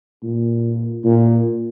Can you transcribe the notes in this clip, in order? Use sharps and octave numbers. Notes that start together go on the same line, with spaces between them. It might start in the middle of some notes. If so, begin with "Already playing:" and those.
A#2
A#2